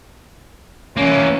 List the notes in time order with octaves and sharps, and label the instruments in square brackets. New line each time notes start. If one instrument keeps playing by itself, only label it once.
[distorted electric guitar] E3 A#3 [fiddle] C#4